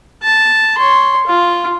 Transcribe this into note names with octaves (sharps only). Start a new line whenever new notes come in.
A5
C#5 C6
F4